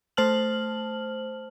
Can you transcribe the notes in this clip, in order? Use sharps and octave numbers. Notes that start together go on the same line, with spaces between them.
A3 C5 A5 F6 F#7